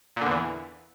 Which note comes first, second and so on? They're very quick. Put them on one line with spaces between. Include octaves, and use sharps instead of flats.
A#2 D3 E2 E3